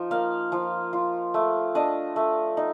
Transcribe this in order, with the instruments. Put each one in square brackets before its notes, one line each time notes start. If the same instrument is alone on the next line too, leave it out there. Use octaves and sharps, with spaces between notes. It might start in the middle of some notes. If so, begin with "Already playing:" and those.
Already playing: [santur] F3 D#4
A#3 F5
F3
F4
A3
D4 D#5
A3
D#4